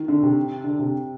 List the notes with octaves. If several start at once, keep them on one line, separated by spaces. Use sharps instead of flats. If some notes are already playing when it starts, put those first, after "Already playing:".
Already playing: D#3
D3
C3
D3
C3